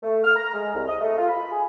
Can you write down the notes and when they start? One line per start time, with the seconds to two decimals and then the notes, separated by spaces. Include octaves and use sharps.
0.03 A3
0.24 F6
0.36 A#5
0.54 G#3
0.74 C2
0.88 D#5
1.01 A3
1.18 F4
1.29 B5
1.52 G#4